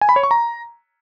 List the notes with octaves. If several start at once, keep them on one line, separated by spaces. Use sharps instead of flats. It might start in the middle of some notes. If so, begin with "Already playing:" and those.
G#5
B5
C#5
C#6
A#5